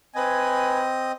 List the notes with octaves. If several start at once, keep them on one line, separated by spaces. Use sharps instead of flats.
C4 B4 D#5 G#5